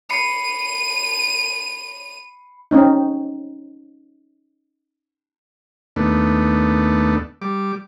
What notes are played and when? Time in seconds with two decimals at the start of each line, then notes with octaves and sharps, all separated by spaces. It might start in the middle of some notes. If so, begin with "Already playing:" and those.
0.10 B5 C7 C#7 D#7
2.71 C4 C#4 D#4
5.96 D#2 A3 B3 D4
7.42 G3 D6